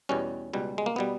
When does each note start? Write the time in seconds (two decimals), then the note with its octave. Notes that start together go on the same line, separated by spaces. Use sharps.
0.09 E2 B2 G3 C#4
0.53 C#2 B2 G3
0.78 G#3
0.86 A#3
0.96 B2 G3 B3